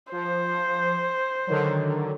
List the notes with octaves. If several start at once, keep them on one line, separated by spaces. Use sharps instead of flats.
F3 C5
D3 D#3 F#3